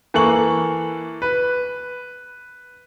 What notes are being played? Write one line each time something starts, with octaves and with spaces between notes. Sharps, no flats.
E3 A#3 A4 C#6 F#7
B4